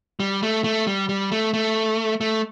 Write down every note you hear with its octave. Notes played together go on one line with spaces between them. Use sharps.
G3
A3
A3
G3
G3
A3
A3
A3